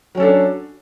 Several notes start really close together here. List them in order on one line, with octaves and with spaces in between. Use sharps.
F#3 C#4 A4 D4